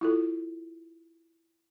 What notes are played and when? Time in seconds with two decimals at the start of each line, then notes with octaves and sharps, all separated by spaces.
0.01 E4 F4 A4